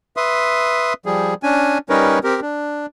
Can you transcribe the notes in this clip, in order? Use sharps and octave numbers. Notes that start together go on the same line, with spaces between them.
B4 E5 C6 D#6
F3 G3 G#4
C#4 D4 G#5
G3 C#4 D#4 A#4 B4 C#5
C4 G4 A#4
D4